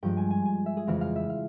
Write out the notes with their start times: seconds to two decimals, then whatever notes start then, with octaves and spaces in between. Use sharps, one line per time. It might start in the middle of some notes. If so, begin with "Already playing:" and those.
0.03 G2 F3 G#3 G5
0.17 G#5
0.30 G#5
0.45 G#5
0.66 E5
0.77 G#4
0.87 F2 C#3 E3 G#3 C4 F5
1.01 F5
1.16 E5
1.30 F5